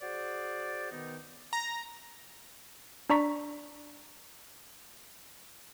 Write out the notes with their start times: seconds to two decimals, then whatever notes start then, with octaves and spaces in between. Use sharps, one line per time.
0.02 F#4 G#4 C5 D5
0.91 B2 D#3 B3 D#4
1.53 A#5
3.10 D4 D5 A#5 C#6 B6